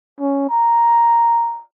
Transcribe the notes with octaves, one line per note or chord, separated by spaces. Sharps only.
C#4
A#5